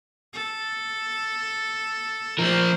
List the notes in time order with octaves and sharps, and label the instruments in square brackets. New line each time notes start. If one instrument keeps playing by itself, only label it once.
[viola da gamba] A4
[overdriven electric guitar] F3 A#4 [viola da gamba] A3 C5